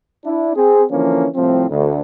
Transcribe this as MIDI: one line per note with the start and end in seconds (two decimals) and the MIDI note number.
0.24 0.53 62
0.24 0.53 64
0.55 0.83 60
0.55 0.83 68
0.91 1.26 50
0.91 1.26 52
0.91 1.26 53
0.91 1.26 58
0.91 1.26 61
1.34 1.66 36
1.34 1.66 45
1.34 1.66 53
1.34 1.66 60
1.70 2.01 38